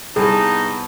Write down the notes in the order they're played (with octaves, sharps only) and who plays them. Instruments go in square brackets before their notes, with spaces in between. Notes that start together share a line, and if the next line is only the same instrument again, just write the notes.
[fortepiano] C2 [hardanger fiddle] B3 A5 [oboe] D#4 [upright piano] G#4